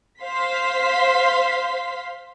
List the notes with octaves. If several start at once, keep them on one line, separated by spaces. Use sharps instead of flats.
C5 F5 C6 B6